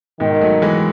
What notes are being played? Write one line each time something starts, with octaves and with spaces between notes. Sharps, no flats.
G#2 B2 D#3
F#3 A3
E3 G#3